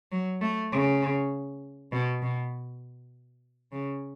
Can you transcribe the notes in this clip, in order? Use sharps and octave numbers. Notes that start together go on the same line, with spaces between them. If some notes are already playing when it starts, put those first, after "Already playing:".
F#3
A3
C#3
B2
B2
C#3